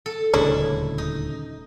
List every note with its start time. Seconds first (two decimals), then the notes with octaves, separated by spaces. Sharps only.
0.06 A4
0.33 D#1 D2 C#3 G#3 D4 E4 C#5
0.98 D#4